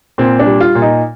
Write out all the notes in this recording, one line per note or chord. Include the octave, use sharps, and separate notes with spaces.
A#2 C4
D4
G3
F4
A#2
D#4